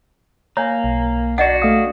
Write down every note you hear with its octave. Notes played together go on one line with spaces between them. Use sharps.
A#3 C#5 G#5 A#5
B1
D4 F#4 D5 D#5 F#5
A3 F5 D#6